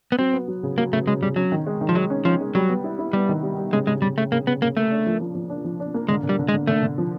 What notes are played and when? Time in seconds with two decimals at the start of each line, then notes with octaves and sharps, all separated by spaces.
0.12 B3
0.19 F#3 C4
0.33 B3
0.48 F#3
0.63 C#3
0.78 F#3 A#3
0.93 C#3 A3
1.07 C#3 G#3
1.22 C#3 G3
1.36 F#3 C#4
1.52 D#3
1.66 G#3
1.81 D#3
1.89 F3
1.95 F#3 G#3
2.10 C#4
2.25 F3 C#4
2.41 G#3
2.55 F#3 G3
2.69 B3
2.84 E4
2.99 E4
3.13 G3 B3
3.29 D#3
3.43 G3
3.58 G3
3.73 C#3 G#3
3.87 C#3 G#3
4.02 C#3 G3
4.18 C#3 A3
4.32 C#3 A#3
4.47 C#3 B3
4.62 C#3 A#3
4.77 A3 A#3
4.91 D4
5.06 F3
5.21 F3
5.35 F3
5.50 D4
5.64 F3
5.80 D4
5.94 A#3
6.09 D3 G#3
6.23 D3
6.29 G3
6.39 D3
6.49 G#3
6.53 D3
6.67 D3 A3
6.83 D3
6.98 F3